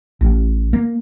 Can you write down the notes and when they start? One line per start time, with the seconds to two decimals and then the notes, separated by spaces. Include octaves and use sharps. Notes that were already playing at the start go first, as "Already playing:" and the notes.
0.21 A1
0.73 A#3